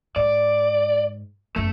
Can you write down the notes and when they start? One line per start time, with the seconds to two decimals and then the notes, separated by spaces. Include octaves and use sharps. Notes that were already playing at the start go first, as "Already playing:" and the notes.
0.16 G#2 D5
1.56 F#1 E2 A3